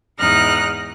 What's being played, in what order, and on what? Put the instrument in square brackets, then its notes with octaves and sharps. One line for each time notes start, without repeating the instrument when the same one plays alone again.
[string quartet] E2 G#2 D#4 F6 F#6 A#6